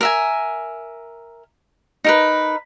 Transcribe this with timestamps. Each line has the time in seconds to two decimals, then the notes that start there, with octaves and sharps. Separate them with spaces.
0.01 A#4 E5 G#5
2.04 D#4 A#4 B4